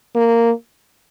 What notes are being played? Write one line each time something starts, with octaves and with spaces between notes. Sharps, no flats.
A#3